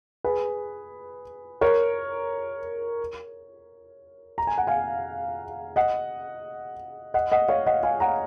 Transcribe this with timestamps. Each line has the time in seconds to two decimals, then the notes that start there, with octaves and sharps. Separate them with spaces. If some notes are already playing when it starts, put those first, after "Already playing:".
0.24 G#4 B4
1.61 A#4 C#5
4.38 A#5
4.47 G#5
4.58 F#5
4.67 F5 G#5
5.76 D#5 F#5
7.14 D#5 F#5
7.32 D#5 F#5
7.48 C#5 F5
7.66 D#5 F#5
7.83 F5 G#5
8.00 F#5 A#5